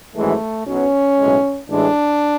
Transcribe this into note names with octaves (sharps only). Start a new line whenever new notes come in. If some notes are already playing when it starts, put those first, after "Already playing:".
G#1 F#2 E3 G#3 A3
B1 B2 F#3 C#4
B1 A2 G#3
A1 A2 E3 G#3 D4